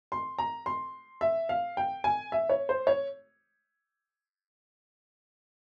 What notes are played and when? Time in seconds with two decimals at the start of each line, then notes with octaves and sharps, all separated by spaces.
0.12 C6
0.39 A#5
0.66 C6
1.21 E5
1.49 F5
1.77 G5
2.04 G#5
2.32 E5
2.49 C#5
2.69 C5
2.87 C#5